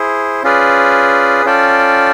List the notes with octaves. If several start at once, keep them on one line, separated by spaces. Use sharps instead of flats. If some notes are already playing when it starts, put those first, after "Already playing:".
Already playing: E4 G#4 C5
C#4 F4 G#4 B4 D5
C#4 F4 A4 D5 G5